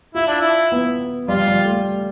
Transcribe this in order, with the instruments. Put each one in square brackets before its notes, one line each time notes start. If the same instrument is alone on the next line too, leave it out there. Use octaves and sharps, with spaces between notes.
[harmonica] E4 [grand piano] F4
[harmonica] D4
E4
[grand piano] B3
[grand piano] G3 [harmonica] F4
[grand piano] G3
A3